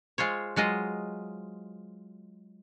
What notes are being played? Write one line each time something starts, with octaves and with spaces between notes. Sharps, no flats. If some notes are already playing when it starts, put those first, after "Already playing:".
G#3 F4 C5 C#5
F#3 G#3 F4 D#5